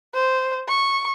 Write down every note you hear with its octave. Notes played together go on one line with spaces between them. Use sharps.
C5
C#6